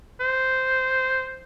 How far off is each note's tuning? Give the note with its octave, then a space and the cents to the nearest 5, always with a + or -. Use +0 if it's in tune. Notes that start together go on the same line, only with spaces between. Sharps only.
C5 -5